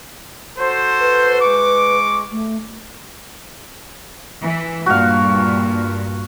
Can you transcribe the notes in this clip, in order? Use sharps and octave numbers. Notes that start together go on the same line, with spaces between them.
F#4 A4 C5
B4
G#3 C#6 D6
A3
E3
G2 A#2 F#4 F5